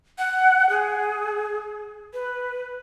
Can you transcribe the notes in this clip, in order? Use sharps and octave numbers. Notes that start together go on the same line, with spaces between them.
F#5
G#4
B4